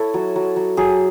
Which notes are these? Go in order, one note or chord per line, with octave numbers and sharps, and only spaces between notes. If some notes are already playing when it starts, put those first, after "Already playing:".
Already playing: E4 A4 C#5
F#3
F#3
F#3
F#3 G#4